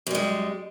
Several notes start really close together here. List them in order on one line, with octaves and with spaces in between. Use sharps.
F#2 G3 G#3